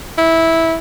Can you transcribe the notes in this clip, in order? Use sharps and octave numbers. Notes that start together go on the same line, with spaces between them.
E4